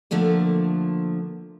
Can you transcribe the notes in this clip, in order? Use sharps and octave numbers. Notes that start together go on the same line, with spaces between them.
D3 F3 A3 A#3